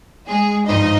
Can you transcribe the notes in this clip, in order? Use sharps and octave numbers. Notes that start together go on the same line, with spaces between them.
G#3 G#4
G#1 G2 F3 D#4 D#5